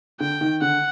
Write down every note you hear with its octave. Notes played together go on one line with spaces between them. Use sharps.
D3 G5
D#3
D3 F#5